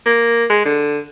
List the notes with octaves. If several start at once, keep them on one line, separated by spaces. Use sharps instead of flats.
A#3
G#3
D3